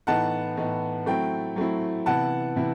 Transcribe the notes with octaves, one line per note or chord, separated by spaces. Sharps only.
A2 E3 B3 D#4 F#5 A5
A2 E3 B3 D#4
F#3 A3 C4 E4 G5
F#3 A3 C4 E4
C3 E3 B3 E4 F#5 A5
C3 E3 B3 E4